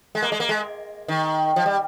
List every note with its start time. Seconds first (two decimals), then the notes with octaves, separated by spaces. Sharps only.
0.15 G#3
0.22 A#3
0.32 G#3
0.40 A#3
0.49 G#3
1.08 D#3
1.56 F3
1.66 G3